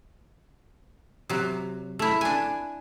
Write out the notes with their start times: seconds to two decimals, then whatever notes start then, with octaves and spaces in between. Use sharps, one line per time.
1.29 C3 F#3
1.99 A3 E4
2.21 D4 G#5